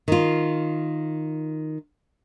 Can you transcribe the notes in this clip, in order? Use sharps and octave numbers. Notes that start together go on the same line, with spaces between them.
D#3 F4